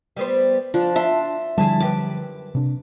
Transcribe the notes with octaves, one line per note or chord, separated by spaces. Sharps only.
G3 B3 C5
F3 D4
E5 A5 C6
E2 D3 F3 G3 E4 G#4 A5
F#2 G4 B4 D6
C3 D4